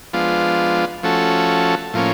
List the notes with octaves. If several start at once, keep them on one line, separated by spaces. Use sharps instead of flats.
F3 G#3 B3 D4 F4
F3 A3 C#4 F#4 A4
A2 F3 A#3 C#4